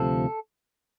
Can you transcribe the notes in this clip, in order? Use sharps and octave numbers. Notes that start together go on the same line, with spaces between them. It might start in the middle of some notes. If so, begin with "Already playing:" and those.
Already playing: D2 C3 F3 A4